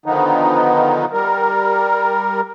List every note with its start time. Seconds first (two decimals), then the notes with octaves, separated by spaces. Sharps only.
0.06 D3 D#3 F3 B3 D#4
1.12 G3 A#4